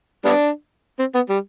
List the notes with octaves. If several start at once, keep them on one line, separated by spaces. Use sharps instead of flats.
G3 B3 D4
C4
B3
G3